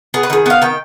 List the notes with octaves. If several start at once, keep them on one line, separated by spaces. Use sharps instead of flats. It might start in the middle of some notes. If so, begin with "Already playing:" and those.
B3 G#4
B4
D#3 G#4
B3 F5
D#3 G5